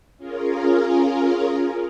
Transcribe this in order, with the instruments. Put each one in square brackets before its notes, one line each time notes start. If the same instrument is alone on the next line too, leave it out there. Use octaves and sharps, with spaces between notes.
[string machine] C#4 F4 G#4 A#4